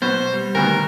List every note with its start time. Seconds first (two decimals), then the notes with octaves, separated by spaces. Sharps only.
0.02 B2 F#3 B3 C5
0.34 G3
0.55 D2 B2 D#3 A#4